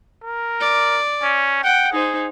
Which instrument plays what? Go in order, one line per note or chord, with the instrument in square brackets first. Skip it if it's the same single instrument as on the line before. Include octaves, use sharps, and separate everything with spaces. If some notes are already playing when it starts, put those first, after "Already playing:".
[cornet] A#4
[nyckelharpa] D5
[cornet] C#4
[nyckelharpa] F#5 [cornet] G5
[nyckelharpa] D#4 C5 [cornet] G#4